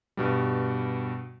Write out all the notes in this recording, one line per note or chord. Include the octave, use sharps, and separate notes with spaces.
G2 B2 G3